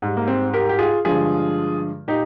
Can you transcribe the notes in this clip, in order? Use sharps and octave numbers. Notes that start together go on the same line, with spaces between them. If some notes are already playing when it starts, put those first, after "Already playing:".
G#2 G3
A#3
C4
G4 A#4
G4
F4 G#4
G2 D3 F3 G#3 F4 G#4
A#2 D#4 G4